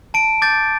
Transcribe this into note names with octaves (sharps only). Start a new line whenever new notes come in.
A5 D7
D6 G6 A6